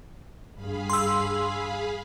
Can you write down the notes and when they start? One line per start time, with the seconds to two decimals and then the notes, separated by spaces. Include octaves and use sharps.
0.54 G2 G#4 F5 B5
0.90 C6 E6